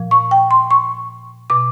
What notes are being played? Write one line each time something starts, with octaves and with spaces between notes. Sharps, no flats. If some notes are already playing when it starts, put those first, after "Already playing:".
Already playing: A#2 F3
C#6
G5
C6
C#6
B2 D6